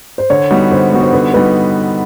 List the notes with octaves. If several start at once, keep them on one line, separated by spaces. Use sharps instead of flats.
C5
D3 C#5
G3 B3 D#4 F#4
D3 C5
G3 B3 D#4 F#4
C5
D3 B4
G3 B3 D#4 F#4 B4